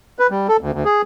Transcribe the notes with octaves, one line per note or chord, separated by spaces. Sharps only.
B4
G3
A4
D2
D2
G#4